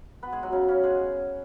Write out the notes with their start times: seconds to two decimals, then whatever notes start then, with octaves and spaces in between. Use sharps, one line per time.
0.23 B3 B4
0.32 G#3 G#4
0.43 F#3 F#4
0.53 C#3 C#4
0.68 C#3 C#4
0.83 G#3 G#4